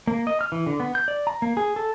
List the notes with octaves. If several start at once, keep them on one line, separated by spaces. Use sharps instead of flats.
A#3
D#5
F6
E3
D3
B3
G6
D5
A#5
A#3
G#4
A4